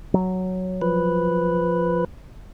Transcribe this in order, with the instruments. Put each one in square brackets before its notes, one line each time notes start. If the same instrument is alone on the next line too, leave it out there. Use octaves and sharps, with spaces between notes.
[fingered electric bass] F#3
[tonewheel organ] F3 B4